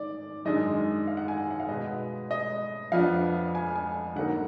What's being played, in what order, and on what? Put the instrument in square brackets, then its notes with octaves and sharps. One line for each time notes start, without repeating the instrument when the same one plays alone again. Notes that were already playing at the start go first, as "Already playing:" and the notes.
Already playing: [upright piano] D#3 D5
F#2 D#3 G#3 D4 D#5
F5
F#5
G#5
F#5
F#5
F5
B2 G#3 B3 D#5
D#5
F2 F3 B3 D4 F5
G#5
G#5
D3 F#3 A#3 D#4 F#5